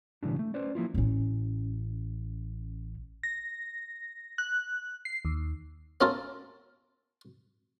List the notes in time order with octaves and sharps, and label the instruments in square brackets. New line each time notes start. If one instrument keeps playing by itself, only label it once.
[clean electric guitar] B1 A2 C#3 E3 G3 D4
A3
C#4 B4 C5 D5
F3 A#3 E4 F4
[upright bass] A1 C#4
[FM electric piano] A#6
F#6
C7
D#2
[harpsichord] B3 C#4 F4 A4 A#4